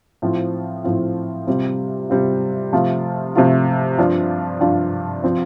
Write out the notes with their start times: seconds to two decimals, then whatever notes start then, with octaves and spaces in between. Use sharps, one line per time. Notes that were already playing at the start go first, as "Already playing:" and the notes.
0.22 A2 F3 C4 F4
0.84 A2 F3 C4 F4
1.47 C3 G3 C4 F4
2.10 C3 G3 C4 F4
2.73 C3 F3 A3 F4
3.36 C3 F3 A3 F4
3.98 G2 F3 D4 F4
4.61 G2 F3 D4 F4
5.24 F3 C4 F4